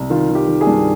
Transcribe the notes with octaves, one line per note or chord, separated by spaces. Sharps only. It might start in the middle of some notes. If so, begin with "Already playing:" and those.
Already playing: C2
D#3 F4
D#3
G4
D#3
G#4
G2